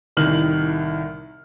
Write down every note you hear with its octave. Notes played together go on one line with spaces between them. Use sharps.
C2 A2 D#3 F6 F#7